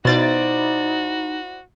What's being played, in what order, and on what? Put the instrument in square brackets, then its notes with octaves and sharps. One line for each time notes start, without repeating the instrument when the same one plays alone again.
[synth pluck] B2 A6 [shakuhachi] D#4 [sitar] E4 C5 D5 [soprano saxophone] F#4